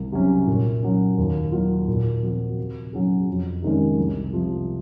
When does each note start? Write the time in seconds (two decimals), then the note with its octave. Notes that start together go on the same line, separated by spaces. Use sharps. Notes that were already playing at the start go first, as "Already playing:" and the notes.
Already playing: C2
0.12 C3 F#3 C#4
0.47 A#2
0.83 F#3 C#4
1.18 D#2
1.52 D#3 F#3 A#3 F4
1.88 A#2
2.23 F3 C4 F#4
2.57 C3
2.93 F#3 C#4 G#4
3.28 F2
3.62 C3 D#3 G#3 C#4
3.98 C2
4.33 C3 F3